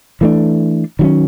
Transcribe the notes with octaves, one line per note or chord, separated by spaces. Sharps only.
E3 A3 D4
D#3 F#3 A#3 C#4